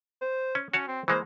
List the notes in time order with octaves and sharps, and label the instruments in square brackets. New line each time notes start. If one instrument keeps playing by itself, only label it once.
[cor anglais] C5
[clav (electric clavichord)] C#4
[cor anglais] C#4 [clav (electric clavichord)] F#4 C#5 A5
[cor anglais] C4
[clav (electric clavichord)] E3 G#3 A#3 [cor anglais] C5